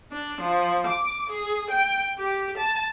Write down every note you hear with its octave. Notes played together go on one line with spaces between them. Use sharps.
D4
F3
D6
G#4
G5
G4
A5